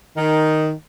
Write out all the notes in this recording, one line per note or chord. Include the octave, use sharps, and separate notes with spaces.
D#3